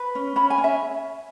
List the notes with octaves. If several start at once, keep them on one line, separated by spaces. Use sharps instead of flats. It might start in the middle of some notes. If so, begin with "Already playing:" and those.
Already playing: B4
C#4
C#4 B5
G#5
C#4
E5